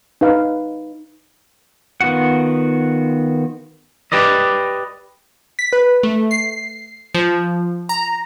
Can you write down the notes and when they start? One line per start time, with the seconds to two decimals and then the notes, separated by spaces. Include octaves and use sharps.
0.21 D#4 B4 F5
2.01 D#3 B3 F4 F#4 F#5
4.12 G4 B4 D5 D#5
5.59 B6
5.73 B4
6.03 A3
6.31 C7
7.15 F3
7.89 A#5